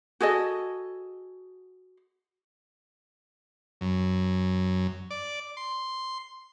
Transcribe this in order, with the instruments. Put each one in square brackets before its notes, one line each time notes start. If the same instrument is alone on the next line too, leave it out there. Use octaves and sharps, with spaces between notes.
[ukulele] F#4 G#4 A4 D#5
[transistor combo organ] F#2
D5
C6